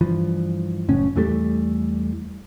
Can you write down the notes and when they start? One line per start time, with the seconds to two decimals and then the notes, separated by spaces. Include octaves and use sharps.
0.01 G2 E3 F3
0.89 F#1 A2 C#4
1.16 E2 E3 G3 A3